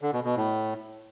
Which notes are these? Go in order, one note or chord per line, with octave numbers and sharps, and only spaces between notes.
D3
B2
B2
A2